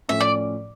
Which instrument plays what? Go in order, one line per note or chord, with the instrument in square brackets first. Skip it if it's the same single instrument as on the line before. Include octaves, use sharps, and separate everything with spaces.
[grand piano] A2 F3 C#4 F4 [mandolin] E5
[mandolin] D5